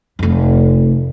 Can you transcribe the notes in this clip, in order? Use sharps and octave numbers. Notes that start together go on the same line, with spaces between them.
F1 F2